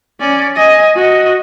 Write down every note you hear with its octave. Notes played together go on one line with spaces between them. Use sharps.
C#4 D5
D#5 G#5
F#4 D#5